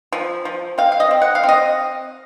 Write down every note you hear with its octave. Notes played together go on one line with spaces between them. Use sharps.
F3
F3
C4 F5
F5
D#5
C4
F#5
F5
C4
D#5